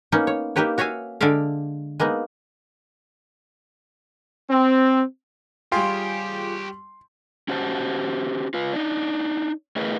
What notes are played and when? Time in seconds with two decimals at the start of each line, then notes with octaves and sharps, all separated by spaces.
0.12 A#3 B3 C#4 D#4
0.27 C#5
0.56 A#3 D#4 G4 B4 C#5
0.78 F#4 C#5 E5 F5 G#5
1.21 D3 G#3 D5 E5 F5
2.00 G#3 A#3 B3 D#4
4.49 C4
5.72 G3 F4 G4 G#4 C#5 G5 C6
7.48 C#4 F#4 G4 C5 A5
8.54 F4 B4
8.73 D4 D#4
9.76 A3 E4 G#4 A#4 B4 D#5